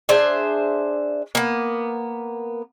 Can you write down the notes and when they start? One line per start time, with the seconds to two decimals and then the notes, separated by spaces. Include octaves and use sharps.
0.09 D4 G#4 C5 E5
1.35 A#3 B3